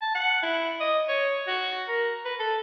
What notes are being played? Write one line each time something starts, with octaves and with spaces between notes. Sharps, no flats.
A5
F#5
E4
D#5
C#5
F#4
A#4
B4
A4